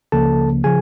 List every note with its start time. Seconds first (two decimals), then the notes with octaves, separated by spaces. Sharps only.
0.12 C#2 C#3 F3 A#3 A4 A5
0.64 C#3 F3 G#4 G#5